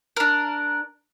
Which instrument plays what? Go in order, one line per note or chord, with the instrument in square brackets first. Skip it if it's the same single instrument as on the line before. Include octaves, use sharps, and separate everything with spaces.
[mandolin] D4 A#4